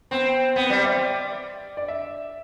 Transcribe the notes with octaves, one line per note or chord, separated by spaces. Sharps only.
B3 C4
B3 C4
G3 B4
C5
E5
D5
D5
E5